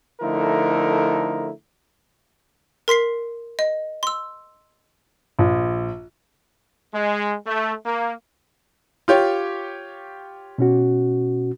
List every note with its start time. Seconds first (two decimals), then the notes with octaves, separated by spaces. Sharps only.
0.21 D3 F3 A3 D#4 E4 A#4
2.88 A#4 C6 B6 C7
3.59 D#5
4.03 C6 E6
5.39 A#1
6.93 G#3
7.46 A3
7.85 A#3
9.08 F4 G4 C#5
10.58 B2 C#4 F#4